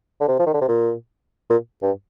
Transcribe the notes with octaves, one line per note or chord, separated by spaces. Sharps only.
D3
C3
F3
D#3
D3
C3
A#2
A#2
G2